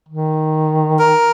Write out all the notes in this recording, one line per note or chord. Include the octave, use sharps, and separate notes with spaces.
D#3
A#4